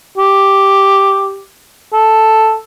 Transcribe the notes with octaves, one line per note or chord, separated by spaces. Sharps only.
G4
A4